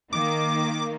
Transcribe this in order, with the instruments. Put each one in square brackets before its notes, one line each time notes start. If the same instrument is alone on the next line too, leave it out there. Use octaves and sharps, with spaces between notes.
[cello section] D#3 A#3 [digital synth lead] D6